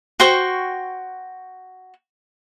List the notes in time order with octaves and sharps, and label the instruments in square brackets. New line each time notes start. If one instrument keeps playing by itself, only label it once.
[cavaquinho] F#4 C5 G5 C#6